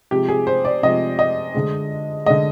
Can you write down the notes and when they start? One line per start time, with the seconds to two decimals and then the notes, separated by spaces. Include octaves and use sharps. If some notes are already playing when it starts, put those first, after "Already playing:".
0.11 C3 F3 G#3 G4
0.29 G#4
0.47 C5
0.65 D5
0.83 C3 F3 G#3 D#5
1.19 D#5
1.54 D3 G#3
2.26 D3 G#3 D#5